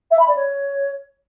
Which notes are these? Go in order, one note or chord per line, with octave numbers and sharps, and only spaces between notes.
E5
B5
D5
C#5